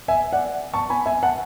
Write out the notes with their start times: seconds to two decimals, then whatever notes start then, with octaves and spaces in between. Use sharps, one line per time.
0.08 E5 G#5
0.33 D5 F#5
0.74 A5 C#6
0.90 G#5 B5
1.06 E5 G#5
1.23 F#5 A5